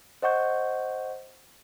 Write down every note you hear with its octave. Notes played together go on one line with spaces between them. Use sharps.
C5 D#5 F#5 C#6 G6